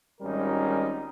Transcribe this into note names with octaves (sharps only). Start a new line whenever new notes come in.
G#1 G3 C#4 D#4 A#4